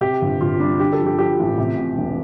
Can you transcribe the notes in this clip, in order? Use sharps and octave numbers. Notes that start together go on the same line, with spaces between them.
C3 G4
G1
G1 F4
G3 D4
D3 G4
A4
F3
G4
F3 G4
A1
C3
C3
E1